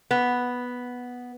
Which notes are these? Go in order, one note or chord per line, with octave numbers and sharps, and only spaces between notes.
B3